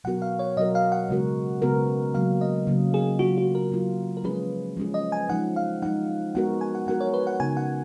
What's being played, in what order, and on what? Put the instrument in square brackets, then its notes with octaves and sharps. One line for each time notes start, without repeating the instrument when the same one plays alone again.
[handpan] B2 F#3 B3 F#4 A#4 [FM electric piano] F#5
[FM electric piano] F5
C#5
[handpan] B2 F#3 B3 F#4 A#4 [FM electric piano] D#5
[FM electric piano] F5
F#5
[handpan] C#3 G#3 B3 F#4 A#4
C#3 G#3 B3 F#4 A#4
[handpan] C#3 F#3 A#3 [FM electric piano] F5
[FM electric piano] D#5
[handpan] C#3 F#3 A#3
[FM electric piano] G#4
[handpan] F#3 A#3 F4 [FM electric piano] F#4
[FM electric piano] F#4
A#4
[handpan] F#3 A#3 F4
[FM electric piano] A#4
[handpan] F3 G#3 C#4 G#4 [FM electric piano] B4
[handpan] F3 G#3 C#4 G#4
[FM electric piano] D#5
G#5
[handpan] F3 G#3 D#4 [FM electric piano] F#5
[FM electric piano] F5
[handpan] F3 G#3 D#4 [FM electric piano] F#5
[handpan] G#3 B3 F#4 A#4 [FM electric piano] F#5
[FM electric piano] G#5
F#5
[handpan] G#3 B3 F#4 A#4 [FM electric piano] F#5
[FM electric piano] C#5
B4
F#5
[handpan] C#3 F3 B3 D#4 [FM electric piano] G#5
[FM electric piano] F#5